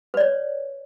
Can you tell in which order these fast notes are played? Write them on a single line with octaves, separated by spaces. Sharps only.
B4 D5 C#5